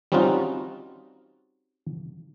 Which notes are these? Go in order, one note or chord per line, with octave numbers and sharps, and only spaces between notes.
G3 C4 C#4 D#4 F4 F#4